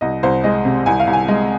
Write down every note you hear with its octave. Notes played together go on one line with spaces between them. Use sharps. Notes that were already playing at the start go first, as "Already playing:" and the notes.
C2 D#5
C2 C5
G#3 D#5
C3
C2 G#5
F5
C2
G#5
G#3